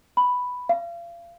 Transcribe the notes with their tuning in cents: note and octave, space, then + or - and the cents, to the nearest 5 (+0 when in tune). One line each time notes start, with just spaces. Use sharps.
B5 +5
F5 -35